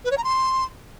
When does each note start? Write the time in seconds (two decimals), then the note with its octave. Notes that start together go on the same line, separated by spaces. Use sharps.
0.04 B4
0.11 C#5
0.17 A#5
0.24 C6